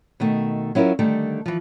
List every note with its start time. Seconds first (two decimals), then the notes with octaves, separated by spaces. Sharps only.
0.20 B2 D#3 A3
0.75 F#3 C#4 E4 F4 A#4
0.99 D3 D#3 G3 A3
1.46 E3 F3